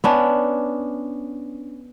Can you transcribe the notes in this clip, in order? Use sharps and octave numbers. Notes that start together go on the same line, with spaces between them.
B3 C#4 D4